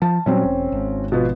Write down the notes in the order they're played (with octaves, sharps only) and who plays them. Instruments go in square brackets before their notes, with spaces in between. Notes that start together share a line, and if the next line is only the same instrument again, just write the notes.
[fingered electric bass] F3 [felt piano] A5
[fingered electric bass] A#2 F#3 G3 [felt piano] C4 C#4
[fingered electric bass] E1
G#1
[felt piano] B2 F3 B3